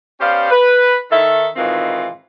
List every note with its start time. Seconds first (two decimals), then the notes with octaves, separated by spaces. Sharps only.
0.20 B3 C#4 G4 C5 D5 F5
0.50 B4
1.11 D#3 A4 E5
1.56 G#2 B2 D#3 E3 C4 F4